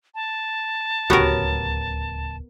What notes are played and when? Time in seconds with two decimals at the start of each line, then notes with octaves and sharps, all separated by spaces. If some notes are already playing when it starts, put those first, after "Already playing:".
0.15 A5
1.10 D1 C#2 C#3 B3 F#4 G4 A#4 C#5